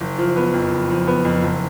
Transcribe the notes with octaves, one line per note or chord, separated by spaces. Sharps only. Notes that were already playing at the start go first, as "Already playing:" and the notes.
F#1
F3
B3
F2
F#1
F3
B3
F2
F#1